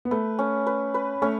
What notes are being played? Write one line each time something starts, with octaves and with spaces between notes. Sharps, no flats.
B3
A3 B4
C#4
B4
B4
A3 C#4